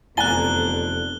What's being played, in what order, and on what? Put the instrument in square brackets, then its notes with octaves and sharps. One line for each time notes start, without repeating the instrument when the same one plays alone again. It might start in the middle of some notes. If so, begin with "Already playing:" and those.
[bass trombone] F1 [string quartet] E2 D3 [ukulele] D5 G#5 A#5 [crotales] F#6 G7